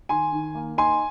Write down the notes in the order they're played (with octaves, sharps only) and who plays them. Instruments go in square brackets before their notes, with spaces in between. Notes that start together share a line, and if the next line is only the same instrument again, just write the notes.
[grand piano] D#3 G#5 C6
D#3
A#3
D#4 G#5 C6